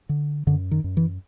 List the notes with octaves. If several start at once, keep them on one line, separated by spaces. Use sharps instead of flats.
D3
F#2 D3
D#3
F#2
E3